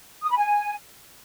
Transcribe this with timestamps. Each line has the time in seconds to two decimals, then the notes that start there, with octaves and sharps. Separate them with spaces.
0.23 D#6
0.30 B5
0.37 G#5